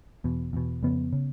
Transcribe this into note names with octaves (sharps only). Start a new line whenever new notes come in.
E2 B2
E2 B2
F2 C#3 B3
C#3